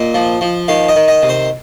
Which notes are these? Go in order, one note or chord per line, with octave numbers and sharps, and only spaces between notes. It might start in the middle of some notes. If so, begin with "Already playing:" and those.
Already playing: A#2 D#5
F3
F3
D#3 F5
D#5
D#3
D#5
C3
C5